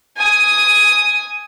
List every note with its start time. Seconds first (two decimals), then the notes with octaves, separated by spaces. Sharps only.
0.17 G#5 D#6